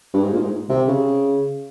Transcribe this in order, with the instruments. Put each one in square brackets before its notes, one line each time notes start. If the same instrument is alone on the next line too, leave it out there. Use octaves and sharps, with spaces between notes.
[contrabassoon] G2
G#2
A#2
G#2
C3
C#3